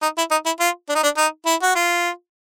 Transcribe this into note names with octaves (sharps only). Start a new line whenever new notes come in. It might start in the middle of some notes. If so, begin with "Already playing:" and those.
D#4
E4
D#4
E4
F4
D4
D#4
D4
D#4
E4
F#4
F4